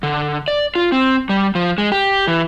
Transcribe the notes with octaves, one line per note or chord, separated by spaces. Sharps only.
D3
D5
F4
C4
G3
F3
G#3
G4
E3